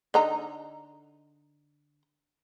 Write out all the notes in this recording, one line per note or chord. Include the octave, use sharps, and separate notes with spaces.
D3 D#4 A#5